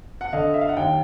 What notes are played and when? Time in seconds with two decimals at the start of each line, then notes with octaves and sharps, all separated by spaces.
0.21 F#5
0.33 D3 D#5 F5
0.54 E5
0.61 F5
0.69 F#5
0.76 D#2 F5 G5